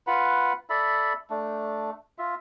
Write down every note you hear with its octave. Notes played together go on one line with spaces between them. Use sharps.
F4 B4 F#5 B5
A4 D5 E5 B5
A3 D4
F4 E5